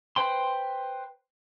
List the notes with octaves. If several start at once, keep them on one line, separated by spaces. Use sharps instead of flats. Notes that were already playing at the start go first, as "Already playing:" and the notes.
B4 C5 G5 C6